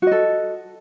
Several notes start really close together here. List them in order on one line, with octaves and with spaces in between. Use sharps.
F#4 D#5 A4